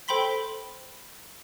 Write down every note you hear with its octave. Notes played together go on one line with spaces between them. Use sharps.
A4 C5 G5 B5 C6 B6